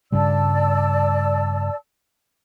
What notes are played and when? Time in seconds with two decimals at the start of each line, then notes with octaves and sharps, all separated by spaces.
0.12 G2 C#3 G3 D5 A5 E6